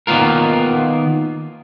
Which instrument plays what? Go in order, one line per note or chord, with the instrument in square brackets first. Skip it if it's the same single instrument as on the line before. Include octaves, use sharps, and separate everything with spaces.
[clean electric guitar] D#3 A#3 B3 F4 A#4